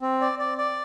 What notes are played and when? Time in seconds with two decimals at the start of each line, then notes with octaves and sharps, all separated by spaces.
0.02 C4
0.21 D5
0.39 D5
0.58 D5